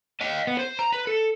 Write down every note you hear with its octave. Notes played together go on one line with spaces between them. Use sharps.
D#5 F5
B3
C5
A#5
B4
A4